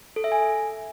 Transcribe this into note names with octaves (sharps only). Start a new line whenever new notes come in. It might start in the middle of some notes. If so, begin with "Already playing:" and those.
A4
E5
G#5